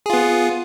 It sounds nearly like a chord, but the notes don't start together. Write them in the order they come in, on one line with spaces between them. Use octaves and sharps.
G#4 F4 B3